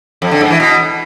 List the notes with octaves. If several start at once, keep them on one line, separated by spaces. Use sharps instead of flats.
F2
D3
G#2
E3
B2